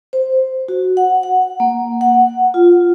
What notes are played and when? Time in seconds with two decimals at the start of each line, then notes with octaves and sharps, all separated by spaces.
0.13 C5
0.68 F#4
0.97 F#5
1.23 F#5
1.60 A#3
2.01 F#5
2.54 F4